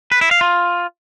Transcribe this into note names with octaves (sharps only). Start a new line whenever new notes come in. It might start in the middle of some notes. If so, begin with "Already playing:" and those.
B4
E4
F5
F4